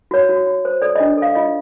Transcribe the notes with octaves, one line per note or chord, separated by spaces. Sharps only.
F#4 C#5
F#4
F#4
C5
A4 D5
D#5
D4
A4 F5
F4 D#5